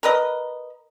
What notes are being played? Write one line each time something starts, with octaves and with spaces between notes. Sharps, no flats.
A#4 B4 D#5